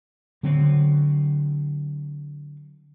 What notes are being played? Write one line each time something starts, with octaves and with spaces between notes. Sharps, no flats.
D3 F#3 C4